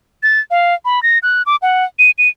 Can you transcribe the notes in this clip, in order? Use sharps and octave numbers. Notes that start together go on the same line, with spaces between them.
A6
F5
B5
A#6
F#6
D6
F#5
D#7
D#7